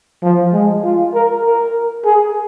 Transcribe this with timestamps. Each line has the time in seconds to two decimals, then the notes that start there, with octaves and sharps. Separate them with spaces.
0.22 F3
0.52 G#3
0.83 F4
1.14 A#4
1.45 A#4
2.05 G#4